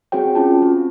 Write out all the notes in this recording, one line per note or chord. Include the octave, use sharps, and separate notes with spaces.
C4 F#4 G#4 C#5 G5
C#4 F4 A5
C4